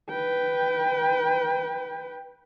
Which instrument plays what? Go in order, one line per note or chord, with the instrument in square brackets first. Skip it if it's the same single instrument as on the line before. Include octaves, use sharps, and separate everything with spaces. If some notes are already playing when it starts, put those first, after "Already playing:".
[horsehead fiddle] B4 G5